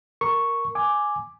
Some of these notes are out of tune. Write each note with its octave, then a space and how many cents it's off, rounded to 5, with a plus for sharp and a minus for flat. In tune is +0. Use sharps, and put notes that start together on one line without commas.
A#4 +0 C#6 +0
G#5 +5 D6 +0